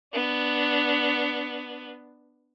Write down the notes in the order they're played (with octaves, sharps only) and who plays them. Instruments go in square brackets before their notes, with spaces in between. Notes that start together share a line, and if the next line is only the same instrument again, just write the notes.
[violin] B3 D4